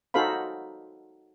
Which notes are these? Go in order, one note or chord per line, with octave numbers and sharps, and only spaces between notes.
D#4 F#4 A4 C5 F5 B5